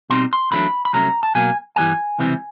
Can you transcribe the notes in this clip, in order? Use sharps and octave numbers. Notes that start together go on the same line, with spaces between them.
B2 G3 C4 D#4 C6
C6
E2 C#3 F#3 A3 D4 B5
B5
C2 B2 F#3 A3 C#4 A#5
A5
B2 F#3 A#3 G#5
G2 E3 G3 B3 G#5
C#2 C3 E3 G3 C4